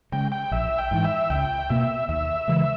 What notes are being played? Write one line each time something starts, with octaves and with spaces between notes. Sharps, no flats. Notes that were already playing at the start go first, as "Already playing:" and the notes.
C#3 G#3 G5
G5
A#1 E5
G5
G#2 E3
E5
C#2 G5
B2 A#3 E5
D#2 E5
C#3 E3 G#3